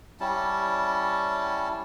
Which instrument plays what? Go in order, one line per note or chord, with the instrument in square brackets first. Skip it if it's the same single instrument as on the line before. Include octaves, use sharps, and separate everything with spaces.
[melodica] G3 C#4 E4 A5